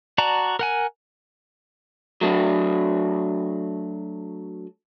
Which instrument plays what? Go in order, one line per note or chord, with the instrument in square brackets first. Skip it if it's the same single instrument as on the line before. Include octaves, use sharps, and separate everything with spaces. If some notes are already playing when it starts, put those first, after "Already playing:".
[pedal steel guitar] F#4 D5 A5 A#5
A#4 F#5 G#5
[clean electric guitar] F#3 A3 D4